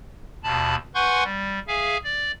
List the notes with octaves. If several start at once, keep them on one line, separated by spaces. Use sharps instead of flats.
D#2 B2 A5 B5
B4 F#5 G#5 C6 C#6 G6
G3
G#4 E5 F5 G#5
D5